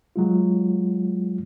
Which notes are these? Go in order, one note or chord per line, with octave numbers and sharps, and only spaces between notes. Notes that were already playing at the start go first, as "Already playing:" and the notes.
F#3 G#3 F4